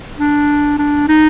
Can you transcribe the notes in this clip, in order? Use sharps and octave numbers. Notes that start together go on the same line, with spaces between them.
D4
D4
D#4